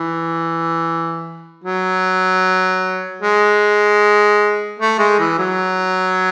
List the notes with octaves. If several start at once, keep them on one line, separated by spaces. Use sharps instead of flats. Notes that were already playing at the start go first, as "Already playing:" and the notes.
Already playing: E3
F#3
G#3
A3
G#3
E3
F#3